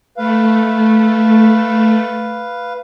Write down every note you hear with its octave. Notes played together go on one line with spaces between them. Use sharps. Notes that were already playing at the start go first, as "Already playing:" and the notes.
A3 B4 F5